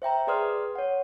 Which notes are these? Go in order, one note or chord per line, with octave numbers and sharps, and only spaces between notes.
C5 E5 G5 A#5
G#4 B4 D5 C6 D#6 F6
C#5 F#5